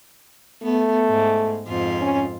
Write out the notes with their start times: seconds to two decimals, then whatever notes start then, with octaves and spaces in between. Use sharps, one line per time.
0.63 A3 B3
1.09 G#2
1.68 F2 G#2 F4
2.01 C#4